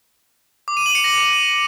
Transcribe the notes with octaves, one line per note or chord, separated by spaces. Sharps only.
D6
D#7
F#7
C#7
A#6